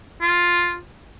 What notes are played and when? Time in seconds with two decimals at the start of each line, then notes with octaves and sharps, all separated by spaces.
0.21 F4